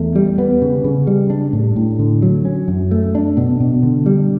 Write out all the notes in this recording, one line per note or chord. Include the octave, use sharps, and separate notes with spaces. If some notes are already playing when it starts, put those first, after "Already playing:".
Already playing: E2 A3
G3
B3
C#3
C#3
G3
D4
A2
A2
D3
F#3
C#4
F#2
A3
D4
B2
B2
D3
G3